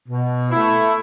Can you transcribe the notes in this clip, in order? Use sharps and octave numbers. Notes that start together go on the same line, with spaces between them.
B2
A3 E4